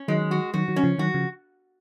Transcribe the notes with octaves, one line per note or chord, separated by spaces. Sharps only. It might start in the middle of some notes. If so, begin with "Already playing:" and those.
Already playing: C#4
D#3 F#3 G#3
F#4
D#3 F#3 F#4
D#3 F#3
C#4
C#3 F3
D#3 F#3 F#4
C#3 F3